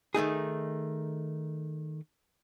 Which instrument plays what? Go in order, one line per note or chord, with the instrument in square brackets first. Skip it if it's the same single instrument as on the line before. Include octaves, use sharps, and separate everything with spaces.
[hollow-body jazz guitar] D#3 A3 D#4 G#4